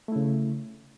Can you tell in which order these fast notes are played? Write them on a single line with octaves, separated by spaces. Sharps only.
A3 E4 C#3